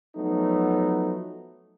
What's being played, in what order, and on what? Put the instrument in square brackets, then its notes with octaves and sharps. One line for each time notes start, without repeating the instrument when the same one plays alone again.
[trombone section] F3 F#3 A3 B3 D#4